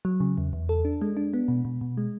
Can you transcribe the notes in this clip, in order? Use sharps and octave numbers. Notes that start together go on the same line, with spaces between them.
F#3
C#3
E2
E2
A4
D4
G#3
D4
B3
B2
B2
B2
G#3